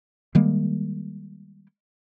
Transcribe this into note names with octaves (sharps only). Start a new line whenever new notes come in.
D#3 G3 G#3 A#3